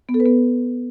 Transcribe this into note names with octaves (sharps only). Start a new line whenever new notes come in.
B3
A4
B4
B3